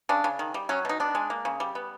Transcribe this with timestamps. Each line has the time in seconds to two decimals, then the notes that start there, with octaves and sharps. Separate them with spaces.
0.09 C#3 D4
0.24 C#3
0.39 D#3
0.54 G3
0.69 F#3 C#4
0.85 B2 D#4
1.00 B3 D4
1.15 G#3
1.30 A#3
1.45 C#3
1.60 G3
1.75 B3